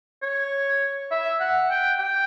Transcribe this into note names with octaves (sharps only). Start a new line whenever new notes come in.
C#5
E5
F#5
G5
G5